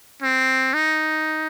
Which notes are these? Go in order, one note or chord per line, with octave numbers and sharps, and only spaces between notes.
C4
D#4